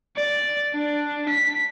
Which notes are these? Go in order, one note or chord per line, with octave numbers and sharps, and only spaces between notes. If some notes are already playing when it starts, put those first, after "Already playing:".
D5
D4
B6